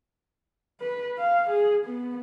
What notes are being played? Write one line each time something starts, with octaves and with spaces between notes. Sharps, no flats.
B4
F5
G#4
B3